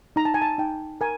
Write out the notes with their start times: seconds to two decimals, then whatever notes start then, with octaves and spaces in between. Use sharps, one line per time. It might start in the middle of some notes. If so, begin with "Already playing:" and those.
0.16 D#4 A#5
0.25 A5
0.34 G#5
0.42 A5
0.58 D#4 G5
1.01 A#4 G#5